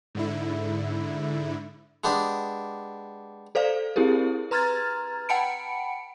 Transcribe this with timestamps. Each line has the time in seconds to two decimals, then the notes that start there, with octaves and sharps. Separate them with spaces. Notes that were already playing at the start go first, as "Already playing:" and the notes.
0.15 G#2 D3 E4
2.04 G#3 B3 D4 G4
3.55 A4 C5 D5 F5
3.96 C4 E4 G4 G#4 A#4
4.51 B4 A#5 C6 F6 G#6 A6
5.29 F#5 G5 A5 B5 C#7 D7